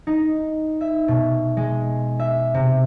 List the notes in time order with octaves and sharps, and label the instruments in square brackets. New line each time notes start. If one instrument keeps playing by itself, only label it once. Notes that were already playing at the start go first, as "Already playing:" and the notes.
[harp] D#4
E5
B2
G#3
E5
C3